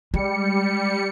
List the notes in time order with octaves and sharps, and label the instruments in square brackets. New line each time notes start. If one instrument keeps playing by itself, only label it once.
[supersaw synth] G3 C#7 [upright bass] G#3